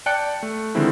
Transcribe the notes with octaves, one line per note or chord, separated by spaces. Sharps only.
D5 G5 A5 F#6 C#7
A3
D3 D#3 F3 G#3 C4 E4